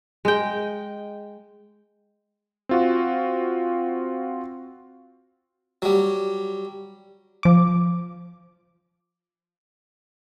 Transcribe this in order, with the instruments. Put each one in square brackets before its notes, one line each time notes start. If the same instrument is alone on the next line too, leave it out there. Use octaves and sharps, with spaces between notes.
[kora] G#3 G5
[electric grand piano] C4 F4 F#4
[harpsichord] F#3 G3
[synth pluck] F3 D6